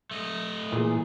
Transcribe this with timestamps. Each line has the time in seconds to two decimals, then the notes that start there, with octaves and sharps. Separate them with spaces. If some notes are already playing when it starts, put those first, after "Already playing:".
0.11 A3 D#5
0.72 A#2 E3 G#4